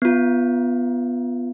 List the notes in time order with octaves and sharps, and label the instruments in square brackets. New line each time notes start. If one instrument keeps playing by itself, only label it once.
[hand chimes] B3 F4